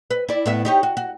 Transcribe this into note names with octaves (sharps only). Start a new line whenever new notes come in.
B4
E4 D5
A2 B3 E5
D#4 G4 C#5
F#4
F#4